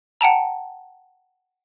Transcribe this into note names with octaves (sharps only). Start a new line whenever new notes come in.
F#5 G5 A5 A#5